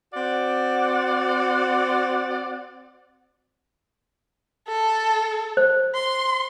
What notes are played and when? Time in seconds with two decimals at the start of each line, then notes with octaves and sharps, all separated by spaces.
0.14 C4 F#4 D5 F#5
4.68 A4
5.57 C5
5.95 C6